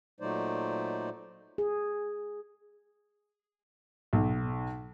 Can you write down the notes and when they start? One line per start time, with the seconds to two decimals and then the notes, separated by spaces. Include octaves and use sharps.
0.20 A#2 F#3 A3 D#4 C5 D5
1.58 G#4
4.13 B1